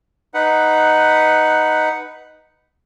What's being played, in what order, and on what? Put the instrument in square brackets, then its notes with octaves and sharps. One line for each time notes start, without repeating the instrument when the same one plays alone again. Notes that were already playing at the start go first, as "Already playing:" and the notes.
[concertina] D#4 B4 F#5